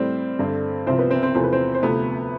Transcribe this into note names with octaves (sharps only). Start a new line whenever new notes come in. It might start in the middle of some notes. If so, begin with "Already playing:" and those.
Already playing: A2 G3 C4 C5
G2 D3 A3
C2 C3 F3 C4 C5
B3 B4
C4 C5
C4 C5
E2 C3 F3 A3 C5
B4
C4 C5
C5
D2 C3 F3 A3 B3 B4